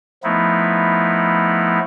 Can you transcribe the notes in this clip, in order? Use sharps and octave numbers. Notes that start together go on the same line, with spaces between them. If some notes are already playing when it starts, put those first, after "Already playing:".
F3 A3 B3 D#4 E4